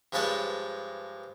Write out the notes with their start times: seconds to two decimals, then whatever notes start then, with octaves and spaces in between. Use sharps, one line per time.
0.12 G2 F3 G#3 B4 C#5 A5